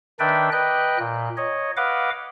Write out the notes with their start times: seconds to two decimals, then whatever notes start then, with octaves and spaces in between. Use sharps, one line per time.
0.20 D#3 D4 B4 D5 E5 G5
0.52 B4 D#5 G5 F#6
0.99 A#2
1.37 C#5 D#5
1.77 B4 D#5 F5 F#5 D6